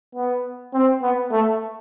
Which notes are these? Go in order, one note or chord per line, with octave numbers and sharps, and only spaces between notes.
B3
C4
B3
A3